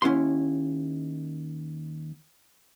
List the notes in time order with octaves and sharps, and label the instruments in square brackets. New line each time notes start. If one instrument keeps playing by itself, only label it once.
[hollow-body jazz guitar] D#2 C#4 E4 F#5 C6